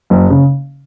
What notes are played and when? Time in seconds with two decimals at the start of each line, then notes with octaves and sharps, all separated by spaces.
0.10 F#1
0.30 C#3